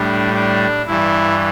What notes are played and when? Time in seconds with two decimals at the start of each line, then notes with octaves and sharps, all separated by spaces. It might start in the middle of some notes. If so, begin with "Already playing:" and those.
Already playing: A2 G3 D4
0.34 D4
0.87 G2 E3 G3 E4